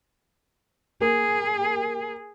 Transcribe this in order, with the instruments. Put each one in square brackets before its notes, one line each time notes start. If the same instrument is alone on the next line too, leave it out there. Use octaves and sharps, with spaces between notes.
[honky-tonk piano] A#3 [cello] G#4